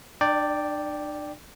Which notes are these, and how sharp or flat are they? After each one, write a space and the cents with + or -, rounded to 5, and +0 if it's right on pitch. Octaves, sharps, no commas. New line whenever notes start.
D4 +40 D5 +0 G5 +0